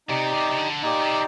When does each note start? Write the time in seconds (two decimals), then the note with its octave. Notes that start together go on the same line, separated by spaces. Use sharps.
0.08 C3 D#4 G4 D5
0.34 C3
0.51 C3
0.58 D3
0.82 A#2 D#4 G4 D5
1.01 C3